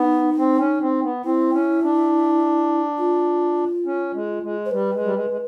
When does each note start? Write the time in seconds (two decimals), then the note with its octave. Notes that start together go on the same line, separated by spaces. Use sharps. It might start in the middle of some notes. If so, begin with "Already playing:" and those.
Already playing: B3 D#4
0.38 C4
0.59 C#4
0.81 C4
1.02 B3
1.25 C4 E4
1.54 C#4
1.82 D4
2.98 F4
3.86 C#4
4.14 G#3
4.43 G#3
4.66 C5
4.71 G3 B4
4.93 G#3
5.04 G3
5.15 G#3
5.30 G#3